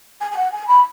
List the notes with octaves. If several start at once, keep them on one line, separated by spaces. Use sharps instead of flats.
G#5
G#5
F#5
G#5
B5